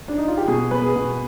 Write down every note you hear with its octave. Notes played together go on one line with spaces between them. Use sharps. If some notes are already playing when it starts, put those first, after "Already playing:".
D4
D#4
F4
G4
B2 G#4
B2 B4
G#4
B2